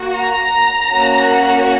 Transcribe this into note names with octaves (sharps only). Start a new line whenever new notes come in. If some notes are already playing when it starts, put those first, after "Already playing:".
Already playing: A#3 F#4
A#5
A#3 C#4 F#4